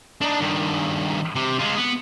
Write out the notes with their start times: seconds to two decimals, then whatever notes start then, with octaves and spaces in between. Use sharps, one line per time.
0.22 D4 D#4
0.41 G2 D#3
1.35 C3
1.59 G#3 F4
1.76 B3